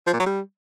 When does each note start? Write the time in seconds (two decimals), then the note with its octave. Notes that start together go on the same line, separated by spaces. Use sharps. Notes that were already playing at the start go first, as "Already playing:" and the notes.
0.07 F3
0.13 A#2
0.20 F#3
0.26 G3